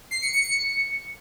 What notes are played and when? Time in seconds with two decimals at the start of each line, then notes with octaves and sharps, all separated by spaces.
0.11 C7
0.22 C#7
0.33 C#7
0.44 C#7